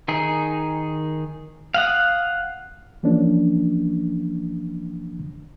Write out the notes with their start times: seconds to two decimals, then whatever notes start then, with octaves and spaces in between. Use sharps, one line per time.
0.08 D#3 D#4 G#4
1.74 F5 F#5 D#6
3.03 E3 F3 A#3 C#4 D4